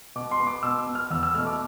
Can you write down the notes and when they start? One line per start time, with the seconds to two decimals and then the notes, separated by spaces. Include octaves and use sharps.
0.16 B2 D6
0.31 C6
0.40 B3
0.47 D6
0.63 B2 E6
0.87 B3
0.95 F6
1.10 E2 E6
1.23 E6
1.35 B2 A3 F6
1.47 D6